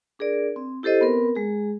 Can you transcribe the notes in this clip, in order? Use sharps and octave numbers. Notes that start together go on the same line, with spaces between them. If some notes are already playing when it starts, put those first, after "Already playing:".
D4 G#4 A#4 D5
C4
E4 G4 A4 C5 D#5
B3 C4 A#4 B4
G#3 G#4